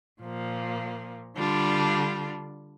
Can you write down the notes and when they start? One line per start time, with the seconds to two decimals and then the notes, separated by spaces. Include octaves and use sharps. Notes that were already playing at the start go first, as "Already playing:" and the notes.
0.22 A#2 F3 A#3
1.36 D3 G3 D4 F4